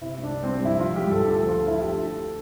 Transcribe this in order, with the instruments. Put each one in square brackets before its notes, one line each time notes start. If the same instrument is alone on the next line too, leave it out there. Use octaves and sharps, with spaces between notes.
[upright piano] C3 E4
C2
D4
C2
C4
G3
A#1 E4
A#1 F4
G3 G4
A#1 A4
D2 A4
F3
F4
F3
E4
D3
G4
D2 A4
D3